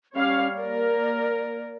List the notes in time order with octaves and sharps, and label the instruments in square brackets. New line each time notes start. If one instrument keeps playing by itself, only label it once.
[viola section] G3 C#5 F5 [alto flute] C#4
[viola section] A#3 A#4 [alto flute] D5